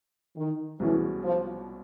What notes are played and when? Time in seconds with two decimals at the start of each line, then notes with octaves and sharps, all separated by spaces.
0.37 D#3
0.80 C2 B2 E3 G#3 C#4
1.24 F3